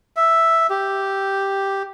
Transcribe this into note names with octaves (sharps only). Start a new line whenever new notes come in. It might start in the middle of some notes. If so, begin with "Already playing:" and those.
E5
G4